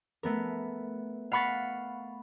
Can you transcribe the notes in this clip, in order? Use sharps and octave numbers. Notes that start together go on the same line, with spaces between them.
A3 B3 A#4
F5 F#5 B5 C#6 A6